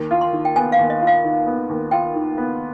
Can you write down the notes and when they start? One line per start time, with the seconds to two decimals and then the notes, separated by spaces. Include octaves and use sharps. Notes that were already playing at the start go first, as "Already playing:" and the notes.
Already playing: D#2
0.11 F4
0.21 C6
0.33 D#3
0.45 G5
0.56 B3 G#5
0.72 F5
0.79 D#2
0.90 D#5
1.01 F4
1.07 F5
1.24 D#3
1.46 B3
1.69 D#2
1.91 F4 G5
2.15 D#3
2.38 B3